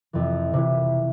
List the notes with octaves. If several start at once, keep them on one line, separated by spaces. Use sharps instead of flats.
F2 C3 E3
C3 E3